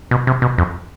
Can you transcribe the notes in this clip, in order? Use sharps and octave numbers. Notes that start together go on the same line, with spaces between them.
B2
C3
B2
F2